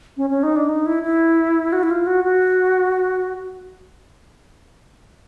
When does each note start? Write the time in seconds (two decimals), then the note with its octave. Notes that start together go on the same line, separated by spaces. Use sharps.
0.17 C#4
0.30 C#4
0.43 D#4
0.56 D4
0.69 D#4
0.86 E4
1.03 E4
1.73 F#4
1.83 E4
1.90 F4
2.07 F#4
2.24 F#4